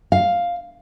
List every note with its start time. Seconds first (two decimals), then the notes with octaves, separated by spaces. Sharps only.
0.12 F5